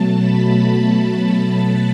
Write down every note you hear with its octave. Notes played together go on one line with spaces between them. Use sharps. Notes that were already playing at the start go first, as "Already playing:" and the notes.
Already playing: B2 F#3 A3 A5
B5